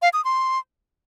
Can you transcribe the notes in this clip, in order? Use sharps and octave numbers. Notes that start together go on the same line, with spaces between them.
F5
D#6
C6